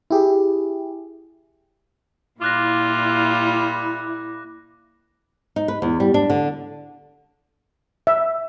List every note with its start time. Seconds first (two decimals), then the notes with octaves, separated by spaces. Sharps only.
0.10 E4 G4 G#4
2.42 A#2 G3 A#3 E4 F4 D6 F#6 A#6
5.56 D#4
5.68 B4
5.82 E2
6.00 G3
6.14 D4
6.30 D3
8.07 E5